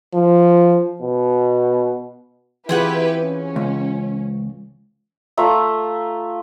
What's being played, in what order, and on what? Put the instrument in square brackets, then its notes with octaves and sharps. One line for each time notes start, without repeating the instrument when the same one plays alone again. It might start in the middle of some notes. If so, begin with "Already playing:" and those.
[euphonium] F3
B2
[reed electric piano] E3 F4 [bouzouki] C4 G#4 F#5 [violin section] E4 G4 B4
[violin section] C#4
[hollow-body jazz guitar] C#2
[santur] A3 F4 E5 A#5